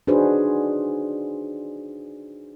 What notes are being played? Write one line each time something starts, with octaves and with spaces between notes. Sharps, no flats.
D4 D#4 F#4 G#4 B4 C5